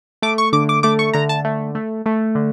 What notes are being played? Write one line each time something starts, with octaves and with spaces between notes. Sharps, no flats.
A3 D6
C#6
D3 D6
D6
A3 D6
C#6
D3 A#5
A5
A3
A3
A3
D3